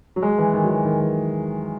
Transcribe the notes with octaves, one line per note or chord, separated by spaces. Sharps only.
F#3
G#3
E3
D#3
F#3
E3
D#3
E3